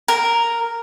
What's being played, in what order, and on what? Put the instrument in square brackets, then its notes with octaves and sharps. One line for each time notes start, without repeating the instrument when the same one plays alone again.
[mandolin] A#4